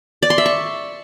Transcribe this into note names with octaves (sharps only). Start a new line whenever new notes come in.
D5
C6
E5
C#6